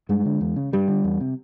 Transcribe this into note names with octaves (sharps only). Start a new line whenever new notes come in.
G2 G#3
D3
E2
C#3
G2 G3
D3
E2
C3